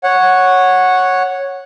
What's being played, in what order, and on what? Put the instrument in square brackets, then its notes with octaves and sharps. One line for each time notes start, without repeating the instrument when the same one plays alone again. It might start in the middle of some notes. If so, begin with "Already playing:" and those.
[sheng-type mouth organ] C#5 F#5